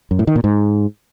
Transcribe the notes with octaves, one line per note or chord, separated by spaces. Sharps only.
F#2
A2
D#3
A#2
G#2